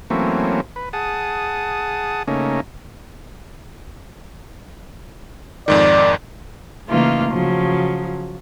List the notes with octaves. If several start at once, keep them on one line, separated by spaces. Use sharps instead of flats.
E3 F#3 A3 A#3 C4 C#4
B4
G#4 F#5 A5 D#6
C#3 A3 A#3 C#4 D#4
F2 G#2 D#3 D5
C#3 E3 A3 A#3 D#4 F4
C#3 F3 F#3